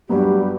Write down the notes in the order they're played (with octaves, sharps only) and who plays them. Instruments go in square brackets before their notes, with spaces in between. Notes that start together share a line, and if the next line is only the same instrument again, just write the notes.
[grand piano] G2 F#3 B3 [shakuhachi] G4